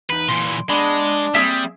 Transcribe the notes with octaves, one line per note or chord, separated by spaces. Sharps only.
E2 D#4 B4
A#2 E3 C6
G#3 B3 D4 A5 B5
G3 A#3 C4 G#4 E5